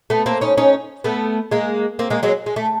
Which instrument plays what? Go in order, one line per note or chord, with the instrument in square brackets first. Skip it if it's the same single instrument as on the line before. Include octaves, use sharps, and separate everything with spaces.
[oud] A3 B3
A#3 C4
C#4 D#4
C#4 D#4
A3 B3
G#3 A#3
A#3 C4
G#3 A#3
F#3 G#3
G#3
A3